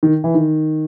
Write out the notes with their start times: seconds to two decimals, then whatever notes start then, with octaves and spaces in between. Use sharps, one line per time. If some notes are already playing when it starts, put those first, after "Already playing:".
0.03 D#3
0.24 E3
0.34 D#3